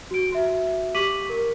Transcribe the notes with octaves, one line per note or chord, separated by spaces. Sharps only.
F#4 D7
F#4 E5
G4 C#6 D6 B6 D#7 F#7
A#4